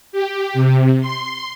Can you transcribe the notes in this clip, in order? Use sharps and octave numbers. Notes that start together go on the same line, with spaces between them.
G4
C3
C6